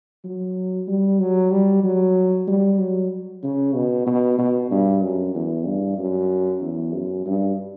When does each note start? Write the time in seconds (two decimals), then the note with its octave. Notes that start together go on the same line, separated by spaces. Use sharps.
0.24 F#3
0.88 G3
1.19 F#3
1.51 G3
1.83 F#3
2.47 G3
2.79 F#3
3.43 C#3
3.75 B2
4.06 B2
4.38 B2
4.71 G2
5.02 F#2
5.34 E2
5.66 G2
5.98 F#2
6.61 E2
6.94 F#2
7.26 G2